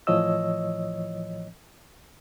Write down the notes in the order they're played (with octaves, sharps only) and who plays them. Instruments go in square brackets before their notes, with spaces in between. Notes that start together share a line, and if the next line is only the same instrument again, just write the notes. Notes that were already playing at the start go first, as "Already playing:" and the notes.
[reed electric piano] A2 E3 F3 C#5 D#5 E6